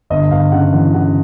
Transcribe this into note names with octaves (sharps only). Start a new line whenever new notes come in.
G1 D#5
G1 F5
C#3 F#5
E3 F#5
C#3 F#5